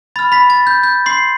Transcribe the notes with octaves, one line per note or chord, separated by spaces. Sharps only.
B5 F6 A6
B5 B6
A6
G6
G6
C6 C7